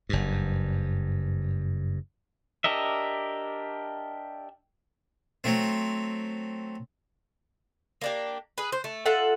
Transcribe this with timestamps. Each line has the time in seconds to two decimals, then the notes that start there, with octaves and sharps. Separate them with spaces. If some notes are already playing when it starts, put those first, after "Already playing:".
0.09 F#1 G2
2.64 D4 G4 A#4 D#5 E5
5.44 F#3 A3 C4
8.01 A#3 D4 G4
8.58 G#4 B4
8.72 C5
8.84 A3
9.06 F4 A4 E5 F#5